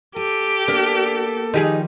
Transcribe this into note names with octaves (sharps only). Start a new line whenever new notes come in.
G4 A4 G#5
A#3 B3 D4 A#4
D#3 F3 G3 D#4 G4 G#4